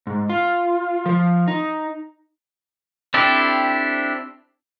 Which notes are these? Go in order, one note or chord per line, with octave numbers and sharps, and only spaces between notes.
G#2
F4
F3
D#4
C4 D4 E4 G4 A4